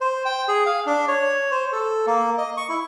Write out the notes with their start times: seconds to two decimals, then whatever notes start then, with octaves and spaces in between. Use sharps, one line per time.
0.01 C5
0.25 G5
0.48 G#4
0.66 F5
0.86 D4
1.08 C#5
1.51 C5
1.73 A4
2.07 A#3
2.38 D#5
2.57 C#6
2.69 E4